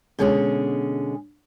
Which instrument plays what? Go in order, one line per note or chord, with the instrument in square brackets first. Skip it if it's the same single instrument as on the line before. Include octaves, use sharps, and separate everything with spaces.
[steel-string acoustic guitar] B2 D3 G#3 C#4 G#4